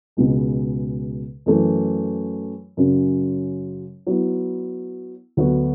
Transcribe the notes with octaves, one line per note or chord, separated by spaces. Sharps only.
C#2 B2 G#3
F#2 E3 A3
F#2 C#3 F#3
F#3 B3 E4
D2 D3 F#3 B3 F#4